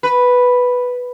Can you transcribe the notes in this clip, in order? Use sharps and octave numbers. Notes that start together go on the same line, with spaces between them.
B4